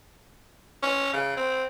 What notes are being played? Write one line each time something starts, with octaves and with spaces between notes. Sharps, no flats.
C#4
C#3
C4